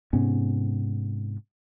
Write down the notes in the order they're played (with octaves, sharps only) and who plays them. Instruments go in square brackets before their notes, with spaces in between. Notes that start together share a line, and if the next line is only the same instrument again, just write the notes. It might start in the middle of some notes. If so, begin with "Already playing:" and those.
[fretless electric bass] G#2 C3 B3 C#4